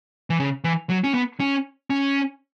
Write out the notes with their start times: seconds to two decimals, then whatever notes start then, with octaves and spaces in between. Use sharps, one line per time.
0.30 E3
0.40 C#3
0.64 E3
0.90 F#3
1.04 C#4
1.14 B3
1.40 C#4
1.90 C#4